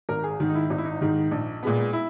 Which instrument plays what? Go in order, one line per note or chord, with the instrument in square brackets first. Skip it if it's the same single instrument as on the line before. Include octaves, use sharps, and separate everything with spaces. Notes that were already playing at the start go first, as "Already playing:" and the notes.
[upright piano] G#1 A#4
G#4
G#2 D#3
D#4
E4
G#1 D#4
E4
D#4
G#2 D#3
A#1
A#2 G#3 B3
E4